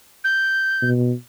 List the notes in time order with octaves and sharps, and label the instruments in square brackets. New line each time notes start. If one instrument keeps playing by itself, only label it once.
[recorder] G6
[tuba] B2